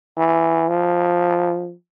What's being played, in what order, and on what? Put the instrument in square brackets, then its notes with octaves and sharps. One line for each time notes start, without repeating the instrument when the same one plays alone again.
[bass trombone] E3
F3